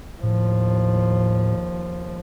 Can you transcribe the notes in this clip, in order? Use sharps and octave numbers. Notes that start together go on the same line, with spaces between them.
D#2 A2 F3